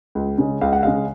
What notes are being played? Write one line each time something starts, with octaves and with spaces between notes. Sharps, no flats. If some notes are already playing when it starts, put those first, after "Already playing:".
C#2
C#3 G#3
C#2 F5
F#5
C#3 G#3 F5